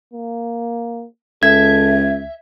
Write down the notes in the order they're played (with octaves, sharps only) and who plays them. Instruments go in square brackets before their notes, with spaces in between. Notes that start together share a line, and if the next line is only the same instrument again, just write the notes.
[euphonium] A#3
[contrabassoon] C#2 [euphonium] A4 [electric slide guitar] E5 [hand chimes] G#6